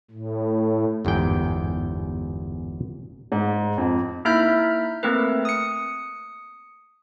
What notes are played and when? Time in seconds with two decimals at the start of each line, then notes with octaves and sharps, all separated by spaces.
0.11 A2
1.05 G1 E2 G#2 G5
3.32 G#2
3.78 F2
4.25 A#3 D#4 E4 E5 F6 G6
5.03 A3 A#3 C4 A#4 B4
5.45 D#6 C#7